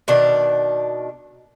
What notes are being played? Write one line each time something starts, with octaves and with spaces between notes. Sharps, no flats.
B2 D#3 D4